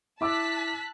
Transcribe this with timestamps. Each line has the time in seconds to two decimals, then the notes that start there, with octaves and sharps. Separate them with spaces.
0.21 E4 A5 D6 E6 F#6 B6